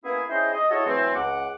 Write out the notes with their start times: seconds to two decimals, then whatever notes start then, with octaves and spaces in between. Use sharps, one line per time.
0.05 A#3 B3 C#4 E4 G#4
0.30 C#4 E4 G#4 C5 D#5 G5
0.53 D#5
0.71 E4 F#4 G#4 A4 C#5 D#5
0.86 E3 F#3 A3 C4
1.15 C#2 F#5 D6